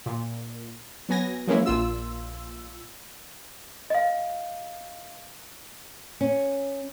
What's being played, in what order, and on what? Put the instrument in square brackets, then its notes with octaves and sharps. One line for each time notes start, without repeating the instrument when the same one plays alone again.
[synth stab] A#2
F#3 B3 G#5 A#6
F3 F#3 G#3 A#3 C#4 E4
A#1 A#2 F4 E6
[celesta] D#5 F5
[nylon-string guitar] C#4